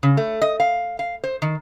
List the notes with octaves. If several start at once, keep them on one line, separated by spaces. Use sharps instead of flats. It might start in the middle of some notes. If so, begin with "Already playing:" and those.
C#3
A3
D#5
F5
F5
C5
D#3